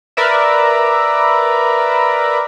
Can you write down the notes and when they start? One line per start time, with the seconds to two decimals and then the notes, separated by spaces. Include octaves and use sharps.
0.17 A#4 B4 D5 E5